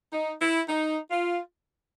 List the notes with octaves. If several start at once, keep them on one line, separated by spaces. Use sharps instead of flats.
D#4
E4
D#4
F4